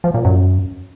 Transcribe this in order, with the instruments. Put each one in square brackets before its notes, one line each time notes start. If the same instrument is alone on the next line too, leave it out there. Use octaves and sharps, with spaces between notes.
[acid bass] F3
A#2
F#2